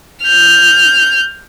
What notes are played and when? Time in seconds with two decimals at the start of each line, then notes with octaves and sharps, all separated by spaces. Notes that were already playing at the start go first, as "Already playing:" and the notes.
0.24 F6 G6